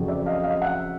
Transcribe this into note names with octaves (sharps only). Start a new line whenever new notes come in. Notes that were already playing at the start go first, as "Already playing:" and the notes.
Already playing: F2 C#3 F#3
D5 E5
D#5 F5
D#5 F5
E5 F#5